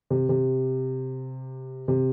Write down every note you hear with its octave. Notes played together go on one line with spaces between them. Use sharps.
C3
C3
C3